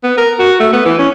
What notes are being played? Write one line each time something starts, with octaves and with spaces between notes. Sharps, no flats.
B3
A#4
F#4
A3
B3
E3
C#4